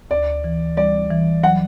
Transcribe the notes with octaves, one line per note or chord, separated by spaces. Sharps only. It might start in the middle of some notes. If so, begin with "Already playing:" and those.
D2 D5
E3
G3 D5
E3
F#3 F#5